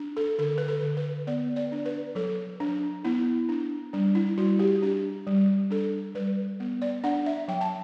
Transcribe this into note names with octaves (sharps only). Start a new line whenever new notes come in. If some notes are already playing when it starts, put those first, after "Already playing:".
Already playing: D4
A4
D3 A4
B4
A4
D3
B4
B3 D5
D5
D4
B4
F#3 A4
F#3 D4
B3 E4
D4
G3 D4
E4
G3 F#4
G4
D4 G4
G3
D4 A4
G3 B4
B3
D5
D4 F#5
E5
F#3 G5
A5